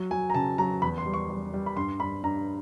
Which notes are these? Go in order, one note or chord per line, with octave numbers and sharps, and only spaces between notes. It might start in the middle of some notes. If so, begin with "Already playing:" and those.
Already playing: F#3
F#3 G#5
A#5
C#3 A5
F#3 A#5
E2 B5
C6
G3
C#6
G3
G3
B5
G2 C6
G2 B5
G2 A#5